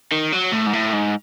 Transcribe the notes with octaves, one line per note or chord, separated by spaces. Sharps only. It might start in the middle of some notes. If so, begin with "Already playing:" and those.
D#3
F#3
A2
G#2
A2
G#2